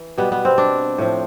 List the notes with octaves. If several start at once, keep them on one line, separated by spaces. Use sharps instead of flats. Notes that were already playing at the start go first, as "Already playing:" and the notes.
Already playing: E3
B2 G3 B3
B3
C4
D4
A2 F3